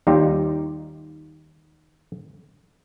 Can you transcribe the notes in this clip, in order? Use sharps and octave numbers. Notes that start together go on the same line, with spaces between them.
D#2 G3 D#4 F4 G4